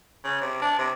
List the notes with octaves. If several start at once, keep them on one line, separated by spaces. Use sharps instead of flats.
C#3
C3
D4
C3